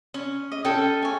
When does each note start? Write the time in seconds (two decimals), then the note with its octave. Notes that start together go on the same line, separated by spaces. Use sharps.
0.14 C#4
0.52 D#5
0.65 C#4 A4 G5
1.02 C#5 G#5